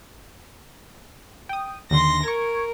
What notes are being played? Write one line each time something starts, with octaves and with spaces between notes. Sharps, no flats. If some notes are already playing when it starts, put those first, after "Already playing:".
G5 D#6
D#2 D3 D#3 C6 A#6
A#4 C#6 G#6